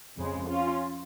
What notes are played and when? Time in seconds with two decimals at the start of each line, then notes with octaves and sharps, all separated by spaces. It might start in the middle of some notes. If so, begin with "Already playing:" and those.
0.17 F2 C#3 G#3
0.49 C#4 F4